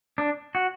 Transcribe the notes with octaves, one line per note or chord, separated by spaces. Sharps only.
D4
F#4